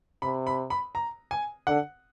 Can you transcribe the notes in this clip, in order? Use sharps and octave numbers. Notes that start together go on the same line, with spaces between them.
C3 B5
B5
B5
A#5
G#5
D3 F#5